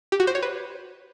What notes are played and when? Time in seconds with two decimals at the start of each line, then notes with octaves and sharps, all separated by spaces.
0.12 G4
0.20 F#4
0.27 C5
0.35 C#5
0.42 B4